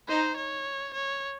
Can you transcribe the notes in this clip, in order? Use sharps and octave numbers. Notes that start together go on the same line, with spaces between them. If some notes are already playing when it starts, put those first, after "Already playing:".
D#4 C5
C#5
C#5